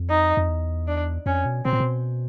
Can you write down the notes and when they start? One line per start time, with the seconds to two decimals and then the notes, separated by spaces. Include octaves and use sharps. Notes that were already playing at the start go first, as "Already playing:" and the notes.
Already playing: F2
0.10 D#4
0.37 F2
0.49 E2
0.88 D4
1.26 F2 C#4
1.45 B2
1.65 B2 C4
1.73 A#2
1.80 B2